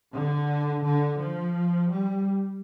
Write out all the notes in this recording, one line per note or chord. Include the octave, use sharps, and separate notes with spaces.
D3
D3
F3
G3